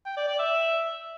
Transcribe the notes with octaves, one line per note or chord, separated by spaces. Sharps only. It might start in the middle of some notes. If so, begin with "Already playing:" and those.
G5
D5
D5
E5